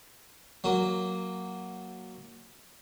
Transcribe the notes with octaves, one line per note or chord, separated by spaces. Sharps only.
F#3 A#3